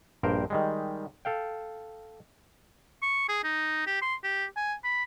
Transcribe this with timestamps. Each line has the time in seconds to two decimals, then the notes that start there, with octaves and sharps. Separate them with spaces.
0.23 A#1 G2 A#4 C5 G5
0.50 D#3 G3 G#3
1.25 A4 F5 G5
3.02 C#6
3.28 G#4
3.44 D#4
3.87 G4
4.02 C6
4.24 G4
4.57 G#5
4.84 B5